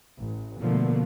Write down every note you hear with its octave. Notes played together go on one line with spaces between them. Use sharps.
A1
B2 D3 F3 A3 A#3